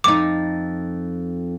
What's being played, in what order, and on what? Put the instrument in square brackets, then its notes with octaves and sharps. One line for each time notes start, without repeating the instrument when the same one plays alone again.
[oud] F2 D#4 [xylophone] D6